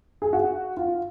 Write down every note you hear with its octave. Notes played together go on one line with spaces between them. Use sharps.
G#4
F#4
F4